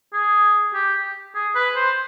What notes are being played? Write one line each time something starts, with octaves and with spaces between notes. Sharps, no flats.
G#4
G4
G#4
B4
C5